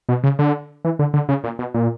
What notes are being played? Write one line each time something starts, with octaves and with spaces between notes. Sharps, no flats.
B2
C#3
D3
E3
D3
D3
C#3
A#2
B2
A#2